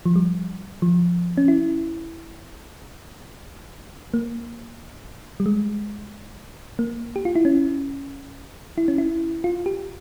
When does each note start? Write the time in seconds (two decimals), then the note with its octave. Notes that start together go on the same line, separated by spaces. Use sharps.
0.06 F3
0.16 G3
0.82 F3
1.37 C#4
1.48 E4
4.14 A#3
5.40 G3
5.46 G#3
6.79 A#3
7.16 G4
7.25 F4
7.36 E4
7.45 C#4
8.78 E4
8.88 C#4
8.98 E4
9.44 F4
9.66 G4